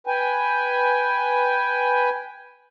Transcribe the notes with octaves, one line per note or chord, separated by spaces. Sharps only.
B4 G5 G#5